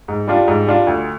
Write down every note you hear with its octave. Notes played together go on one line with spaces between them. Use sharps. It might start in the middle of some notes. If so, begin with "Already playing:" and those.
G#2
G3 D4 F4
G#2
G3 D4 F4
D2